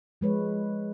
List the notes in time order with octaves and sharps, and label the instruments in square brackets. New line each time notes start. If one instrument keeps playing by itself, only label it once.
[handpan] F3 G#3 B4 C#5